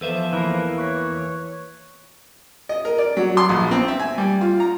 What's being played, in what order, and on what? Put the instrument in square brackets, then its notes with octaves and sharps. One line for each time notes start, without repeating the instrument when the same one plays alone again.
[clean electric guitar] E2 B4 E5 [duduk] F3 [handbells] A4 C5 F5
[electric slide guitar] E3 A#3 [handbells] F5 A#5 B5
[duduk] C#5 [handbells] C#6 F#6 B6
[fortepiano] D#5
A#4
D5
F#3
C6
A#1
C4
E5
G#5
G3
F4
A#5